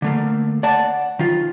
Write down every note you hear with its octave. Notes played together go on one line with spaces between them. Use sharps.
D3 A3 A#3
D5 F#5 A5
D#3 F4